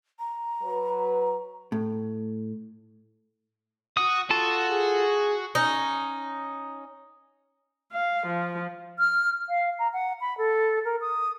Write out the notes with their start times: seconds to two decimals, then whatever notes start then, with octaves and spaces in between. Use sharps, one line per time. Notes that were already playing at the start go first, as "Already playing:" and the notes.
0.19 A#5
0.62 F#3 B4
1.72 A2
3.97 F#4 D#6
4.30 F4 F#4 A4 A5
4.70 G#4
5.55 C#4 D#4
7.93 F5
8.27 F3
8.99 F6
9.49 F5
9.79 A#5
9.93 F#5
10.21 B5
10.38 A4
10.85 A#4
11.01 D#6